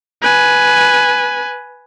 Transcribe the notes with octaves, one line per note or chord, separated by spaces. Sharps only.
B4 G#5